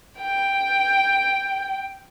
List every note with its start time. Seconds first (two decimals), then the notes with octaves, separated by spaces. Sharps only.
0.20 G5